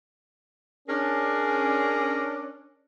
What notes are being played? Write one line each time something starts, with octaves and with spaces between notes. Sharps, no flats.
C#4 D4 G#4 A#4